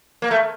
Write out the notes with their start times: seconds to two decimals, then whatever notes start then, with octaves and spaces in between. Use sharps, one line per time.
0.22 A#3
0.31 A3